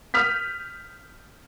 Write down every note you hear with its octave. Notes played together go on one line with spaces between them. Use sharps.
D#6 F6 G6 B6